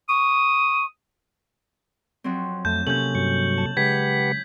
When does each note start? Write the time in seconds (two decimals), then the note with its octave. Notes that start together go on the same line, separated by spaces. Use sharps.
0.09 C#6 D#6
2.24 F2 F#3 C4
2.65 F2 A3 A5 G6
2.87 C3 A#3 C#4 A4 G6 F#7
3.15 G2 F#3 C#6
3.58 A5
3.77 C#3 G#3 G4 B4 F#5 G#6 B6